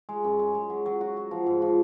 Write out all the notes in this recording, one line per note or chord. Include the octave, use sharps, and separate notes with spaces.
G#3
F#2
G#3
G#3
F#3
F#3
F#4
F#4
F3
G#2
F3